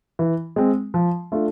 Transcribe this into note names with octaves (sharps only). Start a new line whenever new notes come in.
E3
G#3 C4
F3
A3 D4 F4